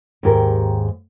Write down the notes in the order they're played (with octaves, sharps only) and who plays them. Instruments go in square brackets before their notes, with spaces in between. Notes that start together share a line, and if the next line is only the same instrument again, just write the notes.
[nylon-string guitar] D#2 G#2 G4 A#4